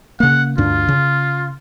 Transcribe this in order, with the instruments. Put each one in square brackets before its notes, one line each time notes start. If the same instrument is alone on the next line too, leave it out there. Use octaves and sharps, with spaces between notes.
[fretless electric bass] C#3 A#3 [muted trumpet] F#5
[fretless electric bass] D2 G2 D4 [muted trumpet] F4
[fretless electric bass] C#3